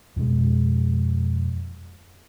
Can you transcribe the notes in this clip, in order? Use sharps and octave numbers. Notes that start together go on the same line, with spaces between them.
F2 B2 G#3